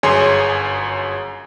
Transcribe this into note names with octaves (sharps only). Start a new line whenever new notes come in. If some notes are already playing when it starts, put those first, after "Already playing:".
G1 F#2 G#4 C#5 G#5 C6